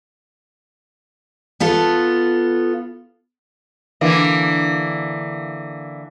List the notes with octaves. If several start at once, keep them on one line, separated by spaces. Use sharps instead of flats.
B3 F4 A4
D3 E3 A#3